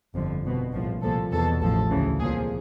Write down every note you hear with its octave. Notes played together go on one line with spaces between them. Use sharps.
G1 F2 D3 F3
C2 B2
A#1 A2 F3
C2 A#2 F3 A4
E2 B2 A4
A1 A2 F3 A4
D2 C#3 E3
C2 A#2 F3 G#4